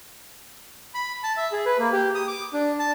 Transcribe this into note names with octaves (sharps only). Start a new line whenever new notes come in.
B5
A5
E5
G#4
B4
A#3
G4
D#6
D6
D4
A5